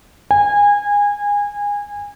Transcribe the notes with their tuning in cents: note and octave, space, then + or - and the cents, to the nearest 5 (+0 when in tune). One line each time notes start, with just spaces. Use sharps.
G#5 -25